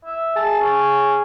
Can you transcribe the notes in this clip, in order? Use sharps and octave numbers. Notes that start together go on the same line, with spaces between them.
E5
G#4 A5
C#4